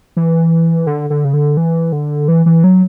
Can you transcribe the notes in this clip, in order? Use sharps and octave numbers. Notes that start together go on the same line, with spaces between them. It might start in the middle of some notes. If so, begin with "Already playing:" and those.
E3
D3
D3
C#3
D3
E3
D3
E3
E3
F#3